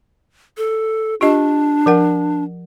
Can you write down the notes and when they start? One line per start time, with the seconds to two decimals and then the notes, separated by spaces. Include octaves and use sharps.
0.57 A4
1.21 D4 F4 G4 D#5
1.86 F3 A#4 F#5